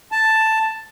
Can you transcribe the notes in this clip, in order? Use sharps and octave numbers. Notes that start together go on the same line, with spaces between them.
A5